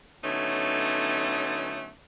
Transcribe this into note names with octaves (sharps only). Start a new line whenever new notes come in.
D3 F#3 A3 B3 C#4 D#4